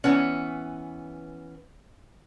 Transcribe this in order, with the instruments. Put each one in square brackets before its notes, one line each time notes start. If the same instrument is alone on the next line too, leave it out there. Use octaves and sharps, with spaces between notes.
[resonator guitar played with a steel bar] E3 B3 C#4